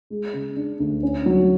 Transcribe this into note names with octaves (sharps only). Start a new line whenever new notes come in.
G#3
C#3
D4
D2
C#4
F#3